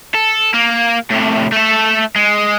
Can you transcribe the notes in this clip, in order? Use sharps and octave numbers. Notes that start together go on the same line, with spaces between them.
A4
A#3
A2 C3
A3 A4
G#3